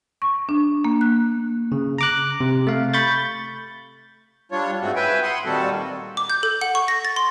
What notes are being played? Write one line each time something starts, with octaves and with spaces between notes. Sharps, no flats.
C#6
D4
A#3
F#6
C#3
A#5 D6 F#6
C3
A3 F5
B5 C#6 G6 A6
G3 D4 F4 C#5
G#2 G#3 A3 C4 F#4
B4 E5 G5 G#5
F#5 B5 C6 D#6
A#2 D#3 G3 C4 F#4 A4
D6
G6
A4
F#5
C#6
A#6
A6
C6